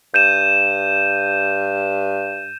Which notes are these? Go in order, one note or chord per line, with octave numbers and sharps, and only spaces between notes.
G2 G6 D#7 E7